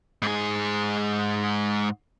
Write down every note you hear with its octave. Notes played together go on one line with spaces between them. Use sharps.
G#2 G#4